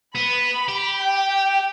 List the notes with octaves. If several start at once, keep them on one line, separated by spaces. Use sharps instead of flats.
B3 B5
G4
G5